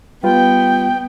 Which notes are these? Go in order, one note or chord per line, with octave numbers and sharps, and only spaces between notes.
G3 B3 F4 B4 G5